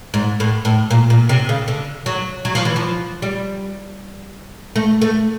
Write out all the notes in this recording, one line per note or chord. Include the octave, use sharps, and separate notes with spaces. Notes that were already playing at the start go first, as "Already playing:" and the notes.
G#2
A2
A2
A#2
A#2
C3
C#3
D3
F#3
F#3
F3
E3
F3
G3
A3
A3